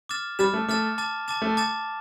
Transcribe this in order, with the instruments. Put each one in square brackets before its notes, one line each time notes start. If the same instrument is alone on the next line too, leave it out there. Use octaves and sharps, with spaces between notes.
[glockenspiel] D6 F6 A6 E7
[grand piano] G3 [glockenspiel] D6 F6 A6 E7
[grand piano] A3
[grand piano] A3 [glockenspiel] D6 F6 A6 E7
[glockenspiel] A5 D6 A6 E7
A5 D6 A6 E7
[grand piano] A3
[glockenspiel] A5 D6 A6 E7